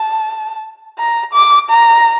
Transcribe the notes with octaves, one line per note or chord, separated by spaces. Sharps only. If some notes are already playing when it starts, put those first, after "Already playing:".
Already playing: A5
A#5
D6
A#5